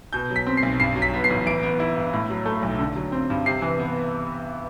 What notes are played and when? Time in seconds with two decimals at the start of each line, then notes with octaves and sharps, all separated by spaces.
0.13 B2 G6
0.30 F#3
0.36 B6
0.47 C4
0.57 C7
0.63 B1
0.80 G2 C7
0.96 F#3
1.02 B6
1.14 B3
1.24 C7
1.30 A1
1.46 E3 D7
1.63 B3
1.80 E4
1.97 G2
2.13 A2
2.30 F#3
2.46 A3
2.63 B1
2.79 D3
2.96 F#3
3.12 C4
3.30 G2
3.46 C3 C7
3.62 E3
3.79 B3